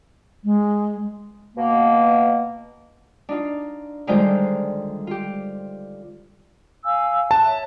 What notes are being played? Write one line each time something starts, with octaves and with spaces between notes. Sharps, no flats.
G#3
B2 A#3
D4 D#4 F4
D3 D#3 G3 G#3 F4 C5
F4 G4
F5 G#5 E6
A5 F#6
C#5 E5